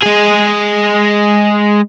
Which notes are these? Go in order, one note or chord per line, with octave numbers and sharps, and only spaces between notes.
G#3 G#4